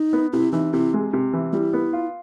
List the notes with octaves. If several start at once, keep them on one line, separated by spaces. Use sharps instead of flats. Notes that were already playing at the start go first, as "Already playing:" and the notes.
Already playing: D#4
B3
C3 E4
E3 D#4
C3 E4
G#3
C3
E3
G3 E4 F4
B3
F4